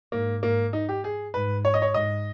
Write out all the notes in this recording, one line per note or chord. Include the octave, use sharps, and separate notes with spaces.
G#2 A#3
G#2 A#3
D#4
G4
G#4
G#2 B4
C#5
D#5
C#5
G#2 D#5